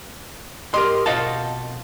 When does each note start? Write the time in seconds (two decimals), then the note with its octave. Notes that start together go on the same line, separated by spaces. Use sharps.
0.74 A#3 G4 D#5 C6
1.06 B2 C4 F4 D#5 F5 A5